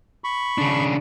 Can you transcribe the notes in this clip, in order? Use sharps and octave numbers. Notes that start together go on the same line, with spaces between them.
B5 C#6
C#3 D4